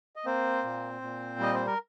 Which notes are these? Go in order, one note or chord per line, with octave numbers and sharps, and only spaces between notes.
D#5
A#3 C4 C5
A#2
A#2
G3 D#5
C5
A#4